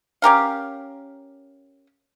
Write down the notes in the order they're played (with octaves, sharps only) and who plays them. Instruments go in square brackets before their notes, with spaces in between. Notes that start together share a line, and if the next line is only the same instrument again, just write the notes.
[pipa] C#4 G4 A#4 F5